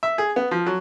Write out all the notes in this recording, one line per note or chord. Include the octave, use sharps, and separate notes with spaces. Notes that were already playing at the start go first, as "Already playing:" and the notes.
E5
G#4
B3
F3
F#3